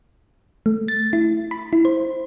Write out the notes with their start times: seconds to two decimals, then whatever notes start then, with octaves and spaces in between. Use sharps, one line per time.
0.66 A3
0.88 A6
1.13 E4
1.51 B5
1.73 E4
1.85 C5